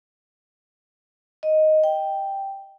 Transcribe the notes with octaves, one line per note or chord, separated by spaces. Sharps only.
D#5
G5